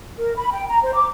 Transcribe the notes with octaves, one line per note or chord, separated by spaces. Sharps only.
A#4
B5
G5
A#5
C5
D6